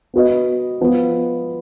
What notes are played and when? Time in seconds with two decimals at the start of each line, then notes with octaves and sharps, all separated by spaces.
0.14 B3 F#4 B4 D#5
0.81 F3 B3 F4